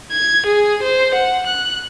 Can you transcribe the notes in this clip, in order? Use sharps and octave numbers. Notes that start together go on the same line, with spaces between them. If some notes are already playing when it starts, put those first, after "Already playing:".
G#6
G#4
C5
F#5
F#6